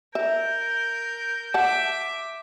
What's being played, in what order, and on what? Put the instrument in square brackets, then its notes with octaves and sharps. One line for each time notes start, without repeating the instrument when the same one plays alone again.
[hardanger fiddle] A#4 [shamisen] E5 [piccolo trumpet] G6
[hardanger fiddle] E5 D6 [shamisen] F#5 A5